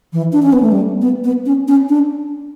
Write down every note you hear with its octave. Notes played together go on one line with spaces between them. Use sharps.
E3
D4
C#4
B3
A3
G3
B3
B3
C#4
C#4
D4